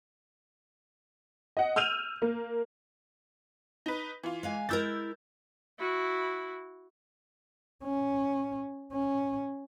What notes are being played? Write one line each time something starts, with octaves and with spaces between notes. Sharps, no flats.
D#5 F#5
E6 F6 G6 D#7 F7
A#3
D#4 B4
E3 F4
G#3 F5 G#5
G#3 E4 A#4 E6 G6 A6
E4 F#4
C#4
C#4